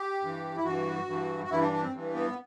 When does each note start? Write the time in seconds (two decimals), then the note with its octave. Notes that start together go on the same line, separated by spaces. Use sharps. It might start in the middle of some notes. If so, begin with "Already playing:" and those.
Already playing: G4
0.22 G2 E3
0.57 E4
0.64 G2 E3 F#4
1.08 G2 E3
1.44 F#4
1.50 G2 E3 E4
1.61 D4
1.72 D4
1.82 C4
1.93 G2 E3
2.15 B3